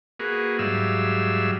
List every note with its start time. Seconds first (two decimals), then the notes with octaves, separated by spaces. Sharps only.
0.20 A#3 F#4 G#4 B4
0.59 G#2 F#3 G3 E5 F5 E6